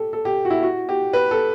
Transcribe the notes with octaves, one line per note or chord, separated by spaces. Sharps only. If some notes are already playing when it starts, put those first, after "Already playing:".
Already playing: G4 A4
A4
G4
F#4
E4
F#4
G4
B4
A4